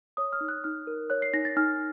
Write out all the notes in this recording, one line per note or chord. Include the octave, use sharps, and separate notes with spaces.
C#5 D#6
F6
D#4
F#6
D#4 F6
A#4
C#5 F#6
C7
D#4 A#6
A6
D#4 F6